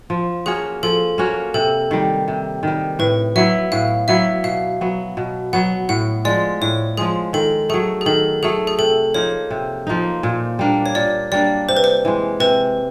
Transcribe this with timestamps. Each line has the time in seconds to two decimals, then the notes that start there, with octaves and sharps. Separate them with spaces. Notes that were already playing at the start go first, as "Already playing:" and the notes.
0.10 F3
0.46 A#3 C#4 F#4 G#4
0.83 F3 A4
1.18 A#3 C#4 F#4
1.54 C3 A4
1.91 D#3 G3
2.28 C3
2.63 D#3 G3
2.99 A2 B4
3.36 F#3 B3 E4 E5
3.72 A2 F5
4.08 F#3 B3 E4 E5
4.44 B2 F5
4.81 F#3 B3
5.17 B2
5.53 F#3 B3 F#5
5.89 A2 F#5
6.25 F3 G#3 D5
6.61 A2 C#5
6.97 F3 G#3 G#4
7.33 D#3 A4
7.69 F#3 A3 G#4
8.01 G#4
8.06 D#3 A4
8.43 F#3 A3 G#4
8.67 G#4
8.78 C3 A4
9.14 F3 A#3 D#4 C#5
9.50 C3
9.87 F3 A#3 D#4
10.23 A#2
10.59 G3 A#3 D4
10.86 C#5
10.95 A#2 D5
11.32 G3 A#3 D4 D5
11.69 C3 C5
11.77 B4
11.84 C5
12.05 E3 G#3
12.40 C3 B4